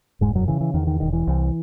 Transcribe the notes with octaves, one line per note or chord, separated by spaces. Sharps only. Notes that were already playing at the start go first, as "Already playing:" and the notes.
E1 G#2 G#3
F#2 F#3
C#3 E3
E3
E2 D#3
D#3
E1 D#3
E3
C2